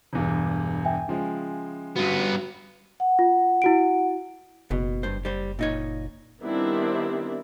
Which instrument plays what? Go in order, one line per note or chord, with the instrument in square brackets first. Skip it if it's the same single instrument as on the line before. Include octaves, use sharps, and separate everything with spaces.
[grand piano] E1 E2 G2
[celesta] E5 G5 G#5
[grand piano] C#3 F3 G#3
[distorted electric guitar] G2 B3 [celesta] F#4
[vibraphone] F#5
[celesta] F4
E4 F#4 D7
[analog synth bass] F#1 [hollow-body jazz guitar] B2
[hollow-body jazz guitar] G2 C5
G3 C5
A#2 D#4 C#5
[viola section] D#3 G3 B3 C4 D4 E4